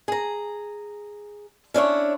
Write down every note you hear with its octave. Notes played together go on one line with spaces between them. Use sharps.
G#4 A#5
C#4 D4 E4 C#5